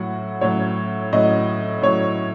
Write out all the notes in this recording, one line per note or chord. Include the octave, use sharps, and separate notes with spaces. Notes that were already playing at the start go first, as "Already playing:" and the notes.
Already playing: A2 F#3 F#4
A2 F#3 C#5
A2 F#3 D#5
A2 F#3 C#5